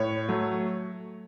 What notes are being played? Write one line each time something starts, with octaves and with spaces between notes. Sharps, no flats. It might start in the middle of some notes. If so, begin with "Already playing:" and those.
Already playing: A2 C#5
F#3 A3